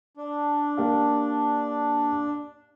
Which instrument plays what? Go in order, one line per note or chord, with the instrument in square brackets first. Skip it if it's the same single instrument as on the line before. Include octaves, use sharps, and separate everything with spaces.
[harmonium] D4
[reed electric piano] A#3 G4 F5